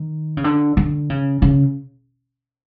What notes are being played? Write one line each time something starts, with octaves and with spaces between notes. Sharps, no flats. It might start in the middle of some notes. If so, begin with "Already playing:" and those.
Already playing: D#3
C#3
D3
D3
C#3
C#3